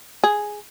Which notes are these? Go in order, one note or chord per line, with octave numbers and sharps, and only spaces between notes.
G#4